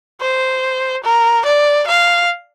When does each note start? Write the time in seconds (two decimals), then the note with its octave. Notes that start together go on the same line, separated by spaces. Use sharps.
0.21 C5
1.04 A#4
1.46 D5
1.87 F5